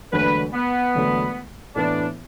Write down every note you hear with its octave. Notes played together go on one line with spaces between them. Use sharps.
E1 D2 D3 F#3 A3 B4
B3
E1 D2 D3 F#3 A3
A2 E3 B3 D4 E4